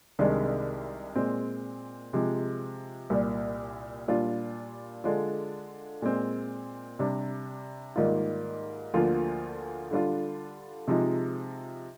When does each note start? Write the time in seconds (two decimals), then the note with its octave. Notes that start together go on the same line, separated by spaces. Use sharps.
0.19 C2 C3 D#3 G#3 D4
1.16 A#2 G#3 C4
2.13 C3 F3 G#3
3.10 C2 A#2 G3
4.08 A#2 G3 D4 F4
5.04 D3 G#3 D4 F4
6.02 A#2 G#3 C4
6.99 C3 G3 D4
7.96 G#2 D#3 G3 A#3 F4
8.94 D2 D3 F3 A#3 F4
9.91 D3 G3 D4 F4
10.88 C3 F3 G#3 D#4